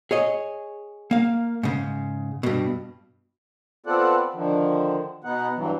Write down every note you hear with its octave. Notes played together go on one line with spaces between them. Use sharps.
G#4 C#5 D#5
A#3 F5
G#2 C#3
G2 B2
B3 C4 F4 A4 D5 F#5
D3 D#3 F3
B2 B3 D#4 F#5
G2 E3 F#3